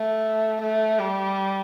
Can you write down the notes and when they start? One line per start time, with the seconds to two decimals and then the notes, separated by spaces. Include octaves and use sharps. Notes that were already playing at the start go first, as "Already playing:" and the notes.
Already playing: A3
0.62 A3
0.99 G3